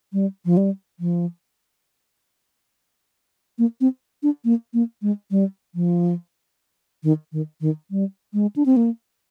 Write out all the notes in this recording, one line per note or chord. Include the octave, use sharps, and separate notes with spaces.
G3
F3
G3
F3
A#3
C4
D4
A#3
A#3
G#3
G3
F3
D#3
D#3
D#3
G3
G#3
D4
C4
A#3